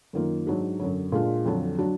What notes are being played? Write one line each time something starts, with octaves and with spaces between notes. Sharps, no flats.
F#2 D#3 A#3 F4
G#2 F#3 D4 F#4
F#2 D3 F#3
A#2 G#3 D4 F4
F2 D3 F#3 D4
F#3 D4 F#4